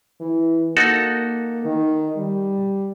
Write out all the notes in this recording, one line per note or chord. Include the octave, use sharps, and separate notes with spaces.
E3
A#3 D#4 F#4 A4
D#3
G3